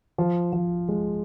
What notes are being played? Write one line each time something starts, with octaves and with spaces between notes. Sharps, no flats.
F3
F3
G#3